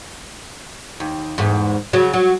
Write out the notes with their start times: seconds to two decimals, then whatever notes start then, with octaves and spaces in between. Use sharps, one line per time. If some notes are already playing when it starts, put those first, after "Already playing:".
1.00 D#2
1.38 E2 G#2
1.93 C#3 F#3
2.13 F#3